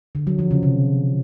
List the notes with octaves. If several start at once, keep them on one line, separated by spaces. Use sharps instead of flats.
D3
F#3
F3
C#3
C3